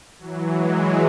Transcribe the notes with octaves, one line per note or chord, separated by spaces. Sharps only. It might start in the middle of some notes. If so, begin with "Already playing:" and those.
E3 F#3
F#3 G#3